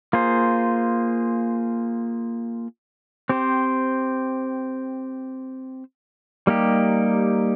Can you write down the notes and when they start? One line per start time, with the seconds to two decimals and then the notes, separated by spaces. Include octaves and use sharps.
0.13 A#3 F4 G#4 C5
3.29 C4 G4 C5
6.47 G3 A#3 D#4 G4